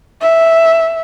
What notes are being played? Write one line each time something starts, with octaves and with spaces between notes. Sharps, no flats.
E5